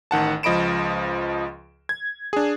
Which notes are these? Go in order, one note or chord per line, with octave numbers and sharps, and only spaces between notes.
A1 D#3 F#5 A5
C#2 F3 D#5 B5 D7 E7
G#6
D4 G#4